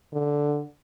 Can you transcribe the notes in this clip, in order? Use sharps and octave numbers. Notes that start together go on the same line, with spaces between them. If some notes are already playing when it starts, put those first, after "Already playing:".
D3